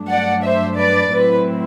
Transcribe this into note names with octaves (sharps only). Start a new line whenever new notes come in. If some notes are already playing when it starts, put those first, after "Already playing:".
Already playing: G2 F#3 A3 D4
D5 F#5
C5 E5
B4 D5
A2 F#3 C4 E4 B4